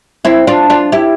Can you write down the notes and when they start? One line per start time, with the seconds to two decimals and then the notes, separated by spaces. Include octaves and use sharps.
0.25 C4 E4
0.47 D4 F4
0.70 D4 F4
0.92 E4 G4